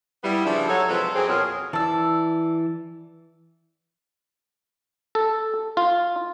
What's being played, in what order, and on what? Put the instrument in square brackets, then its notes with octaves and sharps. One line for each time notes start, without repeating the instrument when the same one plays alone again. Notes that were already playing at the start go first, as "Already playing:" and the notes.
[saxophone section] G3 B3 E4
C#3 F3 G3 B3 D4 E5
F#3 A4 C#5
C3 F3 G#3 A4 B4 C5
F#2 C4 G#4
F2 B2 F4 G#4 A#4 C#5
[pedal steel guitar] E3 E6 [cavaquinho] D5 A5
[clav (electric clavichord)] A4
F4